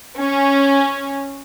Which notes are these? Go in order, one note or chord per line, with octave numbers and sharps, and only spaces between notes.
C#4